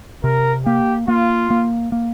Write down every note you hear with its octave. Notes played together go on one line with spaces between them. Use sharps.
C3 A#4
A#3 G4
A#3 F4
A#3
A#3